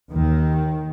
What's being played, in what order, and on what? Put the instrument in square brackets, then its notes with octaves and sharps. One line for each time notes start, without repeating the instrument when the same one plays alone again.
[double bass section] D#2 D#3